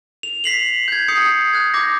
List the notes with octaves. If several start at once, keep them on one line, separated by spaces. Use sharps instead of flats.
F7
B6 C7 F#7
G6 G#6
D#6 G6 C7 C#7
F#6 G#6
D6 G6 A#6